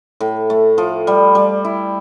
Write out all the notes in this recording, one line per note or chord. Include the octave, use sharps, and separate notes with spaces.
A2
A3
F3
G3
G3
E4